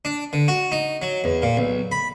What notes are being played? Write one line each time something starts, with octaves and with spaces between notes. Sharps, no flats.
D4
D3
F#4
D#4
F#3
E2
A#2
B1
B5